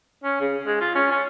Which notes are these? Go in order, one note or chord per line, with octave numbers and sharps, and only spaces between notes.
C#4
C#3
G#3
F4
C#4
C#4